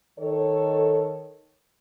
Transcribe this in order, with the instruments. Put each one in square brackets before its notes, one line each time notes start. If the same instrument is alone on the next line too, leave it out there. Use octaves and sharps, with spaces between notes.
[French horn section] D#3 A4 C#5